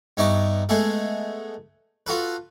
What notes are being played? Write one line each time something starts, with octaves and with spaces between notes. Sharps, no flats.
G2 B3 D#4 E5 C#6 D6
G#3 A3 B3 G#4 A4
F4 F#4 A4 B4